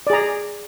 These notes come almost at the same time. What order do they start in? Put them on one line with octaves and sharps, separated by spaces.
D5 G#4 A#5